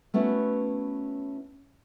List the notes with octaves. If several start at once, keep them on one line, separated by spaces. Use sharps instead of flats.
A3 B3 C#4 E4 F#4